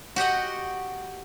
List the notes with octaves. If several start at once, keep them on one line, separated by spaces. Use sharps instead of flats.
F#4 G4 D#5 F#5